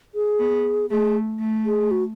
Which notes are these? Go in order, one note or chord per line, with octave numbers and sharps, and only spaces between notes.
G#4
B3
A3 G#4
A3
G#4
F#4